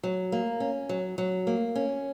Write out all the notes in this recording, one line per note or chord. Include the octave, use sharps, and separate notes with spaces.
F#3
A#3
C#4
F#3
F#3
A#3
C#4